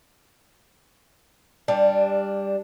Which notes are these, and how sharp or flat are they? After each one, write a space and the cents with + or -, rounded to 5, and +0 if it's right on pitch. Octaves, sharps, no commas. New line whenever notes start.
G3 +15 D4 +0